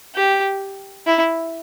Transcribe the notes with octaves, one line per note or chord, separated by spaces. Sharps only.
G4
E4